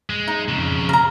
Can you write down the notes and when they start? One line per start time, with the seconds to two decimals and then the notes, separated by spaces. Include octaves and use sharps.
0.10 G#3
0.28 D#4
0.49 F2 C#3
0.89 A#4 A#5